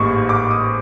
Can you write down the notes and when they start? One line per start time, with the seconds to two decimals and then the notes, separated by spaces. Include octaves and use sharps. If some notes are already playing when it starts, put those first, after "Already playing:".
Already playing: A1 G#2 D#3 G3 A#3 C#6
0.29 D6
0.51 D#6